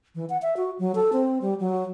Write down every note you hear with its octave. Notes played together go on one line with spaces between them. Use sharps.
E3
F#5
E5
F#4
F#3
A4
C4
G3
F#3